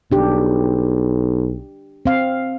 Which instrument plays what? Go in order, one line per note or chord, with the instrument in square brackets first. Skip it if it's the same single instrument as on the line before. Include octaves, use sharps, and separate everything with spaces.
[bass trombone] B1 [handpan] D4 G4
[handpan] C4 F5